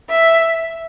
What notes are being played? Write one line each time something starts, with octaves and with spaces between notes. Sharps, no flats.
E5